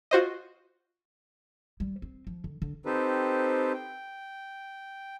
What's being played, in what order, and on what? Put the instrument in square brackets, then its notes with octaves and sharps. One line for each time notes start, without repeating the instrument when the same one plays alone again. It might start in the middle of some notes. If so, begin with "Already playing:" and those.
[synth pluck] F4 F#4 C5 D#5
[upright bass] G3
C4
F3
D3
D3
[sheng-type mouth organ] C4 D#4 G4 A4 B4 C5
G5